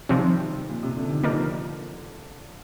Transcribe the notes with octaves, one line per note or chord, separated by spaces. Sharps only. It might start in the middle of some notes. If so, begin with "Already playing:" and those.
C3 D#3 F3 G3 C4
A#2
C3
D3
D#3
D3 F3 A#3 D#4 A#4 D5